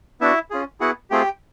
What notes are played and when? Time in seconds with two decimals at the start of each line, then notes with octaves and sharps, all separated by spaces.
0.21 B3 D4 E4 F#4 E5
0.50 C#4 F4 G#4
0.80 B3 E4 F#4 G#4 F#5
1.10 A3 C4 F4 G4 G#4 G5